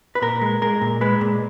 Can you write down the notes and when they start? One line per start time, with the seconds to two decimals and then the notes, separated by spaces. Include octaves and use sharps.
0.15 B4
0.22 A#2 A#4
0.42 G#3
0.62 G#3 A#4
0.81 A#2
1.01 G#3 B4
1.21 A#2